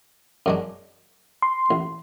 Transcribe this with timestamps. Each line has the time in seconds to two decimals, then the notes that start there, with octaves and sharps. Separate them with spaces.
0.46 F#2 G#3 D4
1.42 C6
1.71 A1